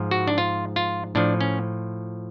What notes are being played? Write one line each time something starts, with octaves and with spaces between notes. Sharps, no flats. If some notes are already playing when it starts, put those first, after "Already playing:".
Already playing: G#2 F3
F#4
D4
F4
F4
A2 F3 D4
C#4